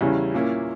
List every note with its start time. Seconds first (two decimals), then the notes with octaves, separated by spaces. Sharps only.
0.01 E2 C#3 G3 C#4 E4
0.34 A#2 A#3 C#4 E4